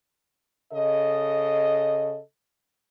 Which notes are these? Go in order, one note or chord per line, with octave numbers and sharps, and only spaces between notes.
C#3 A4 D#5